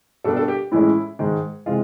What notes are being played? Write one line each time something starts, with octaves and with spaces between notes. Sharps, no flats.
B2 G3 A#3 D4 A4
A4
G4
A2 E3 G#3 C#4 E4
G#2 D#3 G#3
C3 E3 G#3 F4